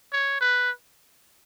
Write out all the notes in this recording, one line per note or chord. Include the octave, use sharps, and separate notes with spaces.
C#5
B4